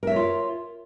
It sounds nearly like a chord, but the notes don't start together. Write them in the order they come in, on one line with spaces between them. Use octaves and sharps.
A#4 E5 C#5 F4